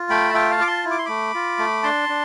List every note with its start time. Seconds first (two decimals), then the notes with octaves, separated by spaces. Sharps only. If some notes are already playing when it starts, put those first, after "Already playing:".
Already playing: F4
0.09 A3 G5 B5
0.29 A5
0.34 F4 E5 G5
0.50 F5 A5
0.60 F4 D6
0.67 A5 C6
0.85 E4
0.91 D6
0.98 C6
1.05 A3 B5 D6
1.34 F4
1.59 A3
1.83 D4 A5 C6
2.09 D4